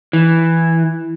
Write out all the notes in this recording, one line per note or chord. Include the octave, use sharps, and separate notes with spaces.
E3